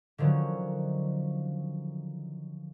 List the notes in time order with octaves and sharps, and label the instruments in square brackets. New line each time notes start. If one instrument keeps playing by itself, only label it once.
[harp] D3 D#3 F3 F#3 C#4